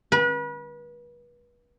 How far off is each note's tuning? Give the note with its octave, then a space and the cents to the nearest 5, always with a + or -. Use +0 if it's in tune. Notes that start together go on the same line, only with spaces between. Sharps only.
B4 -35